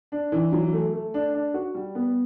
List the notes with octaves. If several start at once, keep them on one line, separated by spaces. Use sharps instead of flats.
D4
E3
F#3
A3
A3
D4
D4
F#4
G3
B3